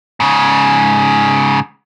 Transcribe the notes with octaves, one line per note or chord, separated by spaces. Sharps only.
G#2 C#3